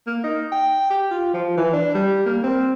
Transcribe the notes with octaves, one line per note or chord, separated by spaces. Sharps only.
A#3
D#4
G5
G4
F4
F3
E3
D4
G3
A#3
C4